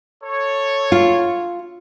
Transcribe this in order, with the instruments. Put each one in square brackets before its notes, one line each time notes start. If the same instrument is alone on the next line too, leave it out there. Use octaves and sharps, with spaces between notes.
[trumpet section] A4 C#5
[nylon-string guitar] F4